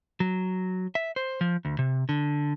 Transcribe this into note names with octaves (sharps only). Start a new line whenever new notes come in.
F#3
E5
C5
F3
D2
C3
D3